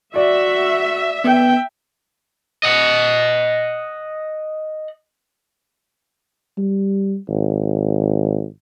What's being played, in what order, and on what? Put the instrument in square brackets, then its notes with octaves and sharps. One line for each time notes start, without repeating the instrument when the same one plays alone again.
[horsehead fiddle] F#4 [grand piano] D5 [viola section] E5
[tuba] B3 [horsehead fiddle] G5
[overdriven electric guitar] D#5 F#5
[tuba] G3
G#1